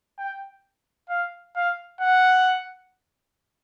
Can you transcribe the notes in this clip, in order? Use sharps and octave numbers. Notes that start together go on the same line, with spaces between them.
G5
F5
F5
F#5